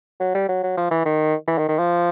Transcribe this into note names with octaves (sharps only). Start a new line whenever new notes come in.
F#3
G3
F#3
F#3
F3
E3
D#3
E3
D#3
D#3
F3